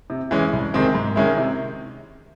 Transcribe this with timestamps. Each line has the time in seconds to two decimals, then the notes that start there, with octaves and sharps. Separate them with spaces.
0.10 C3
0.31 E3 G#3 C#4
0.53 C2
0.74 C3 D#3 G#3 C4
0.95 G#2
1.16 D#3 G#3 C#4 E4
1.37 C3